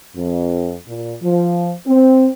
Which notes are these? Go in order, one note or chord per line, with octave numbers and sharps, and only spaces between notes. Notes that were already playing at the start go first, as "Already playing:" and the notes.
F2
A#2
F3
C4